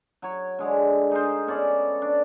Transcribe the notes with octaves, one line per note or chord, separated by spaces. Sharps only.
F#3 C#5
D3 G#3
D#4 G#4 A#4 C5
B3 C#4 A4 D5
D4